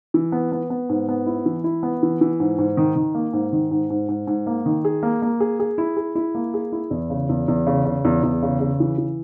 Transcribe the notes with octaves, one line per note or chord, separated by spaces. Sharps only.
E3
B3
B3
B3
G#2
B3
E4
E3
E4
B3
E3
E3
G#2
G#2
D#3
D#3
A#3
G#2
D#3
G#2
G#2
G#2
G#2
A#3
D#3
G#4
A#3
A#3
G#4
G#4
E4
G#4
E4
A#3
G#4
E4
E2
C#3
E2
E2
C#3
C#3
E2
E2
C#3
C#3
E3
E3